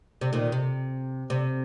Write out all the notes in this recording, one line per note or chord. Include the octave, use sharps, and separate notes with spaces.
C3
A#2 D#3
C3
C3